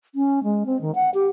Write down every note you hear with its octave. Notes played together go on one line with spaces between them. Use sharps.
C#4
G#3
C4
D#3
F#5
G4